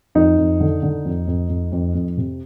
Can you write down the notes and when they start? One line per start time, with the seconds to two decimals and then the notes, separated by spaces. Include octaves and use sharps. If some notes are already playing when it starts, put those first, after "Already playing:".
0.15 F2 D#4
0.38 F2
0.60 D3
0.83 D3
1.05 F2
1.27 F2
1.49 F2
1.72 F2
1.95 F2
2.17 C3